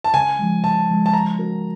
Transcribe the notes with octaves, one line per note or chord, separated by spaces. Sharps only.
A5
C#3 G#5
F3 G#3
C#3 A5
F3 G#3
A5
G#3 A#5
C#4 F#4 A#4